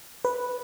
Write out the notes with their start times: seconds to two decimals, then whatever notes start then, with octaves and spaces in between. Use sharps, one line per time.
0.25 B4